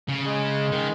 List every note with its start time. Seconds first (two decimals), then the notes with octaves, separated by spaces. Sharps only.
0.08 C#3
0.24 G#3
0.72 D#3